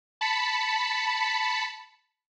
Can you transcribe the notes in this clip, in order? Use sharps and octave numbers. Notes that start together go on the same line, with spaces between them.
A5 B5 B6 C#7